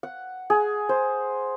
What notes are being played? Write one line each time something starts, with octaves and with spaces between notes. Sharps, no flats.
F#5
G#4
C5